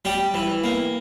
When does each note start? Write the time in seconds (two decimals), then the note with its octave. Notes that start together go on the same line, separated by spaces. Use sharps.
0.05 G3 G4
0.34 E3
0.64 A#3